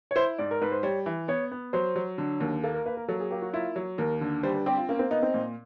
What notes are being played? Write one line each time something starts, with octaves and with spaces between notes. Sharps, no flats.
C#5
E4 C5
G#2 D5
A#4
G#2 B4
C5
G3 C#5
E3
B3 C#5
B3
F#3 C5
F#3
D3
D#2
A#3 A4
A#4
A#3 B4
A#4
F#3 A4
G#4
A#3 G4
F#4
E4 F4
F#3
D#2 A#4
D3
G3 C5
B4
C4 G4
F4
A#3 C#4
C4
B3 D#4
C4
A#2